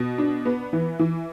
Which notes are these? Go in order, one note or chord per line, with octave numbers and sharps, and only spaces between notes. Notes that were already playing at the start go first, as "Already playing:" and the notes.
Already playing: B2
D4
B3
E3
E3